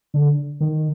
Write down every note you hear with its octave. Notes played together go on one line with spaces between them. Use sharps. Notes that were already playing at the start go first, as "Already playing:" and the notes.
D3
D#3